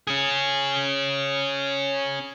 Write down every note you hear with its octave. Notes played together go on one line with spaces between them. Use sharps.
C#4 G#4